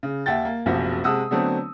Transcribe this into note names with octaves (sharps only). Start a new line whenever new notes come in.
C#3
D#2 E5 F#5 G5 A6
A#3
F#1 B1 C3 F3 F#4 F#5
C3 G#3 F#5 A5 D#6 E6
D3 F#3 A3 B3 C4